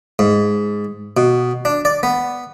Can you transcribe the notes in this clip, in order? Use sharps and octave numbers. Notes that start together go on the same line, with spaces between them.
G#2
B2
D4
D5
B3